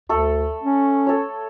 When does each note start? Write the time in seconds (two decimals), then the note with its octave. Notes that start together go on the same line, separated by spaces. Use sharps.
0.09 D2 A3 A4
0.63 C#4
1.07 A4 C#5